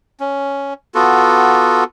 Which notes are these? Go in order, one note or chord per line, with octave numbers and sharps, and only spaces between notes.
C#4
B3 F4 F#4 A4